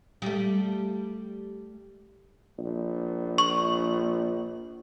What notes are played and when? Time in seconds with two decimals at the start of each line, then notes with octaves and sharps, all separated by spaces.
0.22 G3 A3
2.58 A#1
3.38 C#6